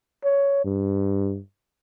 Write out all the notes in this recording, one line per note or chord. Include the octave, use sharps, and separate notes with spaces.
C#5
G2